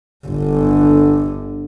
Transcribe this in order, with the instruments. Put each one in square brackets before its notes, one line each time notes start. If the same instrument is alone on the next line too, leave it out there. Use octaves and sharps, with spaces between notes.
[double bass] G1 D3